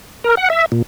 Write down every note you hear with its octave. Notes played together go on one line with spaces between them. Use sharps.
A#4
F#5
E5
A#2